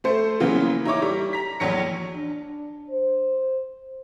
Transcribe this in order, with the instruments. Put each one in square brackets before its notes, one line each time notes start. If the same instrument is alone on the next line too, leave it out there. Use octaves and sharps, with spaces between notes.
[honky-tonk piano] A3 C5 C#7
C#3 E3 F#3 A#3 B3
D#4 E4 C#5 D6
G3
A#5 B6
A#1 E2 F#3 C#5 A#6 C#7
[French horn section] D4
C5